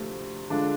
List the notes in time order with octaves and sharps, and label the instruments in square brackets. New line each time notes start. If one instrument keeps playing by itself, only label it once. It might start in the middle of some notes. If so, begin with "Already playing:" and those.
Already playing: [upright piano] D2 C3 F3 A3
D3 G#3 D4 F4